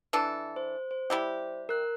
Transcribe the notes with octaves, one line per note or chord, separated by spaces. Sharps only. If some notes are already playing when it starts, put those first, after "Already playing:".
E3 D4 A4
C5
C5
G3 E4 G4
A#4 F#6